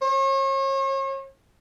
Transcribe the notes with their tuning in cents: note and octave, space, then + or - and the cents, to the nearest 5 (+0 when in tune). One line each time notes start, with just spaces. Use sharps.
C#5 -40